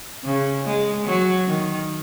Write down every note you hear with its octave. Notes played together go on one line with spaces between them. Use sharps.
C#3
G#3
F#3
D#3